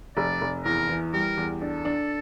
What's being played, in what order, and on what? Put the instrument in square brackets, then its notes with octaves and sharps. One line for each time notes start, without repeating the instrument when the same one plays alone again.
[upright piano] F1 [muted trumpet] D5
[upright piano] F1
[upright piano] E2 [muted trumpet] A#4
[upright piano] E3
[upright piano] G3 [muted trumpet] A#4
[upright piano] E2
[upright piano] D4 [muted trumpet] A4
[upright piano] D4